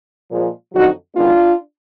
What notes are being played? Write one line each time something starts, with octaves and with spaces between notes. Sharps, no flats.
A#2 F3 G#3
F2 D3 F#3 D#4 F#4
F#2 D#3 G#3 B3 D4 F4